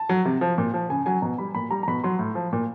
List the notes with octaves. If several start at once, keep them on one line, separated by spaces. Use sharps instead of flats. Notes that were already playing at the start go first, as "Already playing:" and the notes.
Already playing: A5
F#3
C3
F3
A#2
F3
C#3 G#5
F#3 G#5
B2 A#5
G3 B5
A#2 B5
G3 A#5
A#5
B2 B5
F#3 C6
A2
F3
A#2